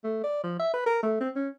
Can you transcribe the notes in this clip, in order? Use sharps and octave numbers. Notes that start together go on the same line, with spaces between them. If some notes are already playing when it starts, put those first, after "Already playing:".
A3
D5
F3
E5
B4
A#4
A3
C4
C#4